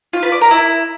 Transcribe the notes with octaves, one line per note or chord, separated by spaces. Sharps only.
F4
B4
D5
A#4
E4